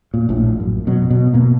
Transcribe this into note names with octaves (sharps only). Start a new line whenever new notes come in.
A#2
A#1 A2
F#2
B2 F#3
B2
B2 A#3